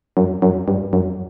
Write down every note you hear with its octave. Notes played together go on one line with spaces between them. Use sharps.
F#2
F#2
G2
F#2